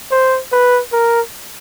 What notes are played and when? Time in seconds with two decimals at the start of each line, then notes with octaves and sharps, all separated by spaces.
0.11 C5
0.52 B4
0.93 A#4